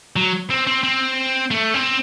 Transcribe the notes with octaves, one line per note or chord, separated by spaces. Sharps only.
F#3
C4
C4
C4
A3
C4